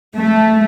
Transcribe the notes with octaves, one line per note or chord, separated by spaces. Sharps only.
A3